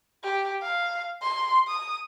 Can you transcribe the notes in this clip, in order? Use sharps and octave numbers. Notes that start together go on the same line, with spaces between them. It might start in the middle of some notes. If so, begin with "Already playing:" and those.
G4
F5
C6
D#6